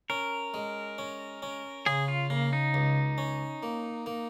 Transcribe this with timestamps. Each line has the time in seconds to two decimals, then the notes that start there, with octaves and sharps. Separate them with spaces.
0.10 C#4 A#4
0.54 G#3
0.98 C#4
1.42 C#4
1.86 C#3 G#4
2.08 F4
2.30 C#3 A#3
2.53 D#4
2.74 C#2
3.18 C#4
3.63 A#3
4.06 A#3